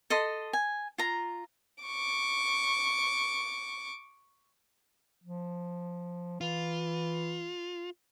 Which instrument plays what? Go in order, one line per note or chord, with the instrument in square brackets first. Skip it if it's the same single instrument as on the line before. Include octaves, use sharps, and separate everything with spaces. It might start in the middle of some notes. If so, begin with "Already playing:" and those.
[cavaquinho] A4 D#5 C6
G#5
F4 A#5
[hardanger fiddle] C#6 D6
[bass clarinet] F3
[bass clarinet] E3 [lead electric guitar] F4